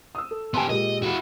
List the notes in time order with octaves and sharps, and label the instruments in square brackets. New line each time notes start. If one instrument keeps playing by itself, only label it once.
[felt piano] D#6 E6
A4
[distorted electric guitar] B3 G4 [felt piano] G#5 A5 C6
[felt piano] A#2 G#3 G4 [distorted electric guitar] D#5
[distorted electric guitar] E4 F#4